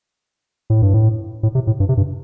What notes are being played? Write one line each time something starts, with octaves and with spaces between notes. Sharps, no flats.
A2
G2
A2
A2
C3
A2
G2
C3
G2